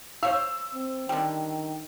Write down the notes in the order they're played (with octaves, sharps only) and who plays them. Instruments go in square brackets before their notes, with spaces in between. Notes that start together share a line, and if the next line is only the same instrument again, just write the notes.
[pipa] C5 C#5 F5 [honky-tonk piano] E6
[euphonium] C4
[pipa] D3 G3 [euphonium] D#3 [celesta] G5